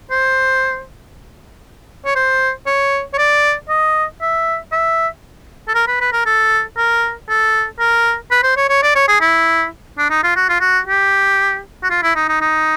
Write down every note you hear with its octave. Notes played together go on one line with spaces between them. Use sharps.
C5
C#5
C5
C#5
C#5
D5
D#5
E5
E5
A4
A#4
B4
B4
A#4
A4
A#4
A4
A#4
B4
C5
C#5
C#5
D5
C#5
G#4
E4
D4
D#4
F4
F#4
F4
F#4
G4
F#4
F4
E4
D#4
D#4
D#4